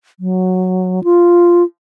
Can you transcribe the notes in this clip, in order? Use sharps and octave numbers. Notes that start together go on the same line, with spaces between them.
F#3
F4